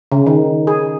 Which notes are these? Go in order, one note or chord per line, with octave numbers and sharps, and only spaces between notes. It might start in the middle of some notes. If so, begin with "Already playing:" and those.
C#3
D#3
G#4